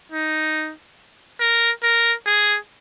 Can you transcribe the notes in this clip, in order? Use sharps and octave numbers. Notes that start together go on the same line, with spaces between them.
D#4
A#4
A#4
G#4